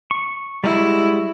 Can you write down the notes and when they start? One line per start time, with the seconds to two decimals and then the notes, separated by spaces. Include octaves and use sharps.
0.11 C#6
0.64 G3 G#3 E4 F#4